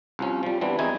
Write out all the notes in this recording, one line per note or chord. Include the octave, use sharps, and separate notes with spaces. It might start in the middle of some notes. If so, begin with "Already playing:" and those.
C2 F3 C#4
F3 G3
E3 G3 B3 C4 D4
E2 C4 D#4 E4 G#5